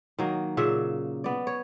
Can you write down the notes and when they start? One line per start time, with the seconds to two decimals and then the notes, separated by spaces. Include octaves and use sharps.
0.18 D#3 F#3 A#3
0.57 A#2 C#3 E5
1.24 B3 D5
1.47 C#5